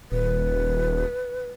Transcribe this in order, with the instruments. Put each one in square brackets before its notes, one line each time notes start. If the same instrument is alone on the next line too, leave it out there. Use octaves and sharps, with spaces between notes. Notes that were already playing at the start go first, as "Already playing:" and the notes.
[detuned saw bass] D#1 [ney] B4